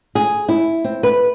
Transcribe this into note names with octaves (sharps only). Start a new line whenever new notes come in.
G#4
E4
C4
B4